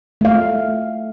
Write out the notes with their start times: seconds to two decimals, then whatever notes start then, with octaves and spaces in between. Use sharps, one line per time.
0.21 A3 F5